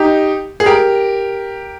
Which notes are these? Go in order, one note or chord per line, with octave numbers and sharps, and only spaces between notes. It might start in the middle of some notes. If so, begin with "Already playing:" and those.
Already playing: D#4 G4
G#4
G4 A#4